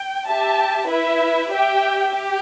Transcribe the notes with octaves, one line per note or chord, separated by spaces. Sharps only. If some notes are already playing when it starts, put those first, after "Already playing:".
Already playing: G5
G4 E5 A5
E4 B4 E5
G4 E5 G5
G4